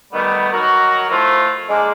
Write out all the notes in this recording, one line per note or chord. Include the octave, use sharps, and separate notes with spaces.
D#3 G3 A3 B3
D#3 F#3 F#4 A#4
F3 A3 E4 F4
G#3 A#3 D4